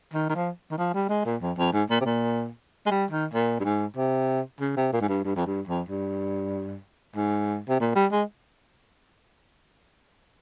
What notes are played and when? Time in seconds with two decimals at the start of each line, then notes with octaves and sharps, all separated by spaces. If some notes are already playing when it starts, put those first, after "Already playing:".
0.13 D#3
0.29 D#3
0.35 F3
0.71 D#3
0.78 F3
0.94 G3
1.09 G#3
1.25 A#2
1.41 F2
1.57 F2
1.73 G#2
1.89 A#2
2.01 C3
2.05 A#2
2.86 G#3
2.90 G3
3.11 D#3
3.33 A#2
3.60 G2
3.64 G#2
3.96 C3
4.60 C#3
4.76 C3
4.93 A#2
5.01 G#2
5.08 G2
5.24 G2
5.36 F2
5.46 G2
5.67 F2
5.89 G2
7.15 G#2
7.68 C3
7.80 A#2
7.95 G3
8.12 G#3